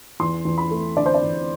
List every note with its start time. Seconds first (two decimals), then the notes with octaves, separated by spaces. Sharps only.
0.20 E2 C6
0.45 E2
0.58 B5
0.71 A3
0.97 D3 D5
1.06 C5
1.14 D5
1.23 E2